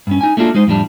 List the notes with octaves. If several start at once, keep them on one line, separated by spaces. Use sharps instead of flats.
G2 C#4
D#4 G#5
A3 A#3 D4 F4 F#4
G#3 D#4 C5
F2 A2 G3 D4